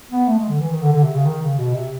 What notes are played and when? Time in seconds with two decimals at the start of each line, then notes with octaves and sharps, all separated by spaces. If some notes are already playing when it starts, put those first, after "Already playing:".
0.11 B3
0.28 A3
0.38 G#3
0.49 D3
0.60 E3
0.71 D#3
0.82 D3
0.92 D3
1.04 C3
1.15 C#3
1.25 D#3
1.42 C#3
1.58 B2
1.74 C3